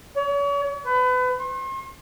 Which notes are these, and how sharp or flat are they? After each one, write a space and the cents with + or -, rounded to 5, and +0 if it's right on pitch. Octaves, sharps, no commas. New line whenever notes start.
C#5 +40
B4 +30
C6 +40